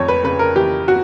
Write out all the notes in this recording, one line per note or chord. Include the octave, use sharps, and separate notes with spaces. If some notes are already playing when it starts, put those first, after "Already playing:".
Already playing: F1 F2 C#5
B4
C#3 B4
A#4
E3 G4
F#4